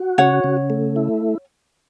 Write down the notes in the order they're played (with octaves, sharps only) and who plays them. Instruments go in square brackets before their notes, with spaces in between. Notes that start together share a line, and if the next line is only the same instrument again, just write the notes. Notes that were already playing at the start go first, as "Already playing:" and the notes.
Already playing: [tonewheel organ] F#4
[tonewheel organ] C#3 [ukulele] C#5 F#5
[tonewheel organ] C#3
A3
E4